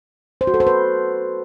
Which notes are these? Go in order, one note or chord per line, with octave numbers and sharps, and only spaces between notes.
C5
F#4
A4
C5
B4